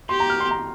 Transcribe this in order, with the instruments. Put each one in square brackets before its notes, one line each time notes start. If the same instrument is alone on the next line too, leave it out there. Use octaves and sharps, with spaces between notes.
[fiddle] G4 [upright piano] C6
[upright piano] A#5
F6
C6
A#5